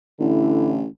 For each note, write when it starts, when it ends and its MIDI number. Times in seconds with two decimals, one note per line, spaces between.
0.20 0.86 33
0.20 0.82 50
0.20 0.82 64